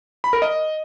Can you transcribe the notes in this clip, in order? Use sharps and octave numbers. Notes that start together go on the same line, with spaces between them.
B5
A#4
D#5